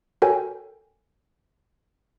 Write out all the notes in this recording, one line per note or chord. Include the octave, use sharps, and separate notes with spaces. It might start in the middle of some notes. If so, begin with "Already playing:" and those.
F#4 A4 A#4 C#5 G5 G#5